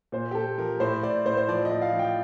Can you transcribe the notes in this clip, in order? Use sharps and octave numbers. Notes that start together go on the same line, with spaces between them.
A#2 C5
G4
A#2 A4
F3 A#4
A2 C5
A2 D5
A2 C5
C5
F3 D5
D#5
A2
F5
F3
G5